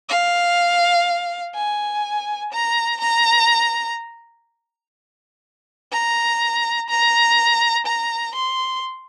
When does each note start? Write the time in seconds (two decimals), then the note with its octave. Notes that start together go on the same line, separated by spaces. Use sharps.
0.09 F5
1.55 G#5
2.52 A#5
3.01 A#5
5.92 A#5
6.90 A#5
7.86 A#5
8.35 C6